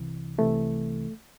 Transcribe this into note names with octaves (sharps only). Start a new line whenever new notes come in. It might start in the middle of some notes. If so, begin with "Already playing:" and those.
Already playing: C2 C3 E3
C2 C3 E3 A3